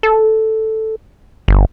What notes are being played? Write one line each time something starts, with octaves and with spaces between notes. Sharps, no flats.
A4
G1